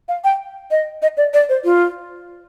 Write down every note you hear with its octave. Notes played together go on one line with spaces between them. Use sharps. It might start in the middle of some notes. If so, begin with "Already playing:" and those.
F5
G5
D#5
D#5
D5
D5
C5
F4